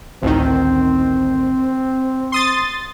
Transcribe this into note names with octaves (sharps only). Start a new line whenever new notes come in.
A1 D2 D#3 C4
C6 D#6 A6